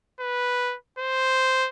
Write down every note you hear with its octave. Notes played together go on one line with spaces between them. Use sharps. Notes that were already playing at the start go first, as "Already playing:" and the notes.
B4
C5